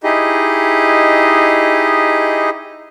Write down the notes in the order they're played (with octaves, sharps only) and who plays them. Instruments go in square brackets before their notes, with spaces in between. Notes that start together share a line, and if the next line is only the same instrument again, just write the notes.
[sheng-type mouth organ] D#4 E4 G4 G#4 D#5